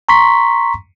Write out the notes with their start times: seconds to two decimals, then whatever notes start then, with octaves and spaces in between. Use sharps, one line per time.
0.09 A#5 C6 C#6 B6